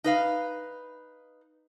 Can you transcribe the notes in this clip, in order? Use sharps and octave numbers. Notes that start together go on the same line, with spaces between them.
D#4 B4 F5